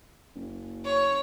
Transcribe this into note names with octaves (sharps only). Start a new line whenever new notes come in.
F#1
C#5